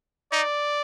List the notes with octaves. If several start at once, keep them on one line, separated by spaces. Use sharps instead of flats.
D#4 D5